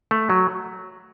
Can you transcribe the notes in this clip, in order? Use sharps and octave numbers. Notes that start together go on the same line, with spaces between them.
A3
F#3